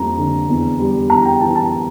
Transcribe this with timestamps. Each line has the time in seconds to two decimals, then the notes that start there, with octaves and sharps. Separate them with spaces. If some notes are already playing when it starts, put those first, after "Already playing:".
Already playing: F2 G3 A#3 A#5
0.18 D3
0.49 E2
0.79 G3
1.10 E2 A#5
1.25 G5
1.40 E3 A5
1.55 A5